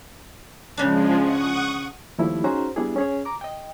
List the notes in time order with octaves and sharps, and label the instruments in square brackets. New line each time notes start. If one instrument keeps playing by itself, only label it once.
[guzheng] C#3 D4 [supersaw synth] F3 G#3
[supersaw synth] F#5 C#6 D#6
[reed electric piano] D#2 F3 G3 A3 E4 B5
C#4 D#4 F#4 G#4 C5 A#5
G3 B3 D4 E4 G#4
C#4 G#4 C#5
A#5 D6
D#5 G5